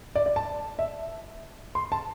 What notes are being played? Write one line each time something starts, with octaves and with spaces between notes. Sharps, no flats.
D5
D5
A5
E5
C6
A5